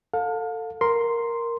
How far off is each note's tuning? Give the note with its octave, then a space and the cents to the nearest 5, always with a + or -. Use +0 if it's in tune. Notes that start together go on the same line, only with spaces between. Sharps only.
A4 +20 F5 +35
A#4 +0 C6 +0